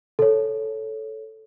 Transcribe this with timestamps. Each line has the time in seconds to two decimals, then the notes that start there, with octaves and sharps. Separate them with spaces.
0.19 A4 C#5